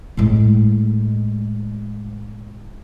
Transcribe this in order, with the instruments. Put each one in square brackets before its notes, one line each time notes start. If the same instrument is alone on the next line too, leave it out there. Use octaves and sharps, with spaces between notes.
[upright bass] A2 G#3